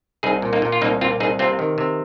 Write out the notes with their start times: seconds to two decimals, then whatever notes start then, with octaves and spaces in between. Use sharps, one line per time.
0.23 C2 D#4 G#4
0.42 A#2
0.53 A#3 D#4
0.62 A#2
0.72 F4
0.81 C2 A#3 D#4
1.01 A#2 C4 F4
1.20 C2 D#4 G#4
1.39 C3 C4 F4
1.59 D#3
1.78 C3